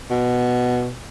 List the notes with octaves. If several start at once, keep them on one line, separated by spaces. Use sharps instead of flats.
B2